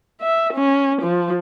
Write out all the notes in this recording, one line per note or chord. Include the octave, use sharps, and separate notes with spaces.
E5
C#4
F3